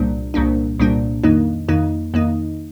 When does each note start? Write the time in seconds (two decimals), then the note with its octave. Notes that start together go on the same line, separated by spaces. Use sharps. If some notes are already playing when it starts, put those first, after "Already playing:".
Already playing: C2 A#2 G3 A#3 D4
0.34 C2 A#2 G3 A#3 D4
0.79 C2 A#2 G3 A#3 D4
1.24 F2 D#3 A#3 D#4
1.69 F2 D#3 A#3 D#4
2.14 F2 D#3 A#3 D#4